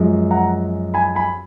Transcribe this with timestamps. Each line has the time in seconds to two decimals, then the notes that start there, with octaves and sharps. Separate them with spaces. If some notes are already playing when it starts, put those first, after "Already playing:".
Already playing: F#2 F3 G#3
0.31 F#5 A#5
0.94 G#5 B5
1.15 G#5 B5